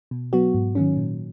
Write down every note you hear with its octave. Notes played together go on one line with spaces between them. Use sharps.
B2
F#3 B3 F#4
G#2
D#3 F#3 C#4
A#2